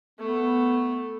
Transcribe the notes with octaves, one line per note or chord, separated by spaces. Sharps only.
A3 B3